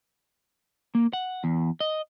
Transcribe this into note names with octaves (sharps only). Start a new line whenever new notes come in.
A#3
F#5
E2
D#5